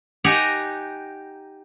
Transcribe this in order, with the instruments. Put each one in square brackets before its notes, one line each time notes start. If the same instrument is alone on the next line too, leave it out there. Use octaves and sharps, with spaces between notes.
[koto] D#4 G4 D#5 F#5 G#5 A#5